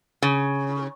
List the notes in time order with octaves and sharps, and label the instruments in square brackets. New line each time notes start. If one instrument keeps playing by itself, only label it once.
[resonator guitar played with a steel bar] C#3